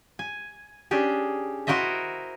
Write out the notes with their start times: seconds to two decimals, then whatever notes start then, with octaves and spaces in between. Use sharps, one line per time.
0.19 G#5
0.91 C#4 D4 G4 G#4
1.67 E4 F#4 A#4 C5 D#5 E5